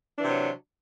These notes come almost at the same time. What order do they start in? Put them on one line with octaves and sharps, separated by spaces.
D4 E3 C3 F#3